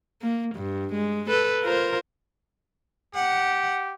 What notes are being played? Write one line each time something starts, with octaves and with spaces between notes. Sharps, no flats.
A#3
G2
G#3
A4 B4
F4 A#4 C5
G4 F#5